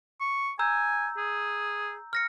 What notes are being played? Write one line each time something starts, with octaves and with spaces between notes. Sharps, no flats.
C#6
G#5 A#5 E6 G6
G#4
F6 A#6 C#7